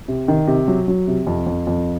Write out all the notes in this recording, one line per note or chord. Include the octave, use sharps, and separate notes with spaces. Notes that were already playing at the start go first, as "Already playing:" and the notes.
C3
D#3
C3
F#3
F#3
C3
F2
F2
F2